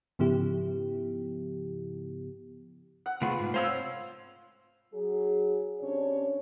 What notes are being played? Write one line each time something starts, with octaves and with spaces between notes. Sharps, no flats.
G#2 C#3 F3 B3 E4 G4
F#5
C3 A3 B3 F4 G#4
G#2
C4 C5 C#5 F5 E6
F#3 G#4
C3 C#4 D4 C#5